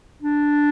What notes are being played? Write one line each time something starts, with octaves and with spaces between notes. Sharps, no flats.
D4